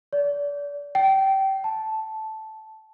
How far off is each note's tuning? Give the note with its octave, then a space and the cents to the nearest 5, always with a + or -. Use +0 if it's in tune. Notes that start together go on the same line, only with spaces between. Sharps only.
D5 -35
G5 -20
A5 -10